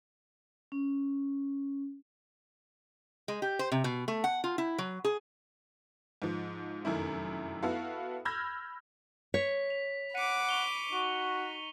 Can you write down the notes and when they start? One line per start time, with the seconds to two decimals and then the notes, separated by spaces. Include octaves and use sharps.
0.72 C#4
3.28 G#3
3.42 G4
3.59 C5
3.72 C3
3.84 B2
4.08 A3
4.24 F#5
4.44 F4
4.58 E4
4.78 F#3
5.04 G#4
6.22 G#2 F3
6.85 F1 F#2 D#3 E4
7.63 B3 E4 F#4 A4 F5
8.25 B5 E6 F6 G6 G#6 A#6
9.34 C#5 B6
9.70 F7
10.15 F#5 B5 D6 B6 C#7 D#7
10.49 C#6 F7 G7
10.93 D#4 F#4